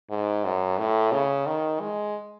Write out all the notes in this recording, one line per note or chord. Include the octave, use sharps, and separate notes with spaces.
G#2
F#2
A2
C#3
D#3
G#3